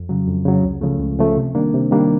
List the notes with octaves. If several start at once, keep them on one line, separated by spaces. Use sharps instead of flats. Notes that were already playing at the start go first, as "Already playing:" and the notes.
Already playing: F2
C#3 F#3
F2
C#3 F#3
C#2
C#3 F3 A3
C#2
C#3 F3 A3
C3
D#3 G3 A#3 D4
C3
D#3 G3 A#3 D4